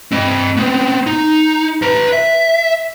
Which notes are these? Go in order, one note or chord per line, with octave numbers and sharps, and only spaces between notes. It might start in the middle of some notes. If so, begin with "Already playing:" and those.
C4 D#5
B3 C4
D#4
B4 A#5
E5